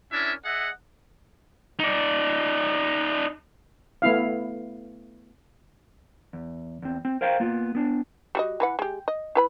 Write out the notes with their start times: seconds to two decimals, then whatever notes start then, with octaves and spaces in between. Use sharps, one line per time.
0.12 C#4 D4 E4 A#4 E5
0.45 G#4 D#5 E5 F#5
1.79 D#4 D5
4.02 A3 B3 E4 F5
6.33 E2
6.82 E2 C4
7.05 C4
7.21 A#4 C5 F5 G5 A#5
7.40 A#3 B3 F4
7.75 B3 D4
8.35 G3 F#4 D#5
8.60 E3 B4 F#5
8.79 G#3 G4
9.08 D#5
9.35 E4 B4 B5